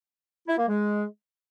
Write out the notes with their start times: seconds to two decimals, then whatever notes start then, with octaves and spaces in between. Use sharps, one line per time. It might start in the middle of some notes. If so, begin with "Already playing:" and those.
0.48 E4
0.58 A#3
0.68 G#3